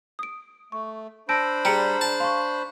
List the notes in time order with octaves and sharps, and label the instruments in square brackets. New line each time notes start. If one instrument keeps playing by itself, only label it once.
[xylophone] D#6 D7
[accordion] A3 [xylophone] C#6
[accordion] D4 C5 B5 [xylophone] A5 G6 [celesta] E6 A#6 D7
[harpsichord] G3 [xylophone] G#4 C#7 D7 [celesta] A#5
[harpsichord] A5
[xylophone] F5 [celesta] C6 C#6